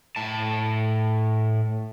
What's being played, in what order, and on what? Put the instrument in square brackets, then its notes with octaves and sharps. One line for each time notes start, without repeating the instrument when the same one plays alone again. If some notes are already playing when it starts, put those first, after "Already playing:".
[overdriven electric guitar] A2 A5